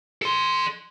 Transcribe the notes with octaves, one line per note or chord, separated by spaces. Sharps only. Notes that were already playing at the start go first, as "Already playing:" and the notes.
A4 C6